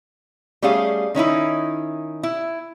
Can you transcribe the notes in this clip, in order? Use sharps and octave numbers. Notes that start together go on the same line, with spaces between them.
G3 A3 C#4 G#4 F5
D#3 C#4 D#4 E4
E4